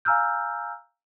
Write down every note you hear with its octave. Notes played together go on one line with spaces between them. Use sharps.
F5 G#5 A#5 E6 F6 G6